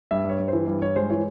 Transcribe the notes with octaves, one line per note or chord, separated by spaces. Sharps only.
G2 E5
G2 C#5
G2
E3 C5
G2
G2 C#5
G#3 C5
E3 C#5